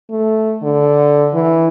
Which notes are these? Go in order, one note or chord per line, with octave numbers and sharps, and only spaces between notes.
A3
D3
E3